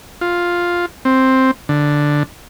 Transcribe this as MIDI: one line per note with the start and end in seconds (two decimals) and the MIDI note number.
0.21 0.86 65
1.05 1.51 60
1.69 2.23 50